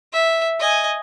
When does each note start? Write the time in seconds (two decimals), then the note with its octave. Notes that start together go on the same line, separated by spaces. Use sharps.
0.13 E5
0.60 D#5 G#5